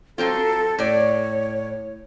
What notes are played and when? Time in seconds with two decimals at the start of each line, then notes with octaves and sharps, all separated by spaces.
0.18 F#3 C4 F4 A4
0.79 A2 C#5 D5